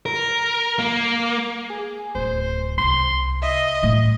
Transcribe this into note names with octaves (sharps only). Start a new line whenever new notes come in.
A#4
A#3
G#4
D1 C5
C2 C6
D#5 E5
A2 A3